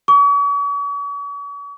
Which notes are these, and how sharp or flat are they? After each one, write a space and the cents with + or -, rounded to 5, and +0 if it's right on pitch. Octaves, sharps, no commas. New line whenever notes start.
C#6 +45